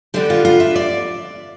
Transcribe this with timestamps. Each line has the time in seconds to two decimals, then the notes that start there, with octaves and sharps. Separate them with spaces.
0.14 D3 G3 B3 G4
0.30 F4
0.45 F4
0.60 E5
0.76 D5